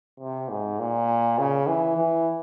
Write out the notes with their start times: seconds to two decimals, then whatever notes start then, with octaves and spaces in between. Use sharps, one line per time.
0.20 C3
0.49 G#2
0.79 A#2
1.39 C#3
1.67 E3
1.97 E3